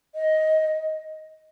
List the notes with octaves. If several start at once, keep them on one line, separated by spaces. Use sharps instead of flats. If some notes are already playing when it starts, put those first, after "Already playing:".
D#5